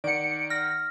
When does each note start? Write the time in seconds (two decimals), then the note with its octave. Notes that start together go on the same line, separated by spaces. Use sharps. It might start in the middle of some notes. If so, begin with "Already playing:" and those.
0.04 D#3 D5 F#5 C#7 D7
0.50 F6 A#6